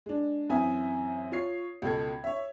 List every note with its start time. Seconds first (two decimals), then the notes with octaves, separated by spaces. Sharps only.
0.06 G#3 D4
0.50 F#2 E3 C4 E5 G#5 D#6
1.32 F4 C#5 C7
1.82 C#2 B2 A4 G#6
2.24 C#5 E5